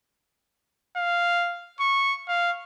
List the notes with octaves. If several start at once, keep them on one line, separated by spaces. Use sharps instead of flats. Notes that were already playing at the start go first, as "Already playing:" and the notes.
F5
C#6
F5